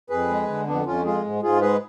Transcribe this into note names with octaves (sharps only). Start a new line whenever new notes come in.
F2 G#4 B4
G#3
D3
F2 B3 D4
F2 C#4 F4
G#3 F4 G#4
G#2
G#2 F4 G#4
G#3 G#4 B4